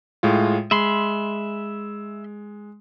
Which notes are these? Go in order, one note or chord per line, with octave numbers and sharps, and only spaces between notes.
A2 G#3 F4
G#3 E5 B5 C6